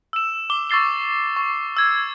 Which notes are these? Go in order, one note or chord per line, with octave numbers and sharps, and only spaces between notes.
E6 E7
D6 G7
C#6 E6 A6 C7 G7
C#6
E6 G#6